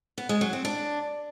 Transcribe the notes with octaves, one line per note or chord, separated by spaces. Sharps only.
B3
G#3
F#3
C4
D4